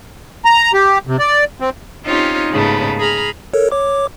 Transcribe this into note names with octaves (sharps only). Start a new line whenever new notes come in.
A#5
G4
C3
D5
C4
C4 C#4 D#4 F4 G4 C#5
D#2 G#2 C#3 A3 B3
G#4 A#5 B5 F6
A4 A#4 C#5
C#5 D6